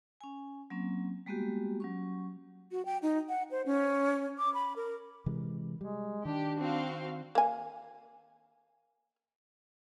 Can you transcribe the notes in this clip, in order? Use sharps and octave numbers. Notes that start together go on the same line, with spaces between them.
C#4 G#5
F#3 A#3 C4 C#4
G3 G#3 A#3 B3 F#4 G4
F#3 C#4 C#6
F#4
G5
D#4
F#5
C5
C#4
D6
B5
A#4
C3 E3 G#3
G3 G#3
D#3 D4 G4
C4 F#4 F5
A#3 G#5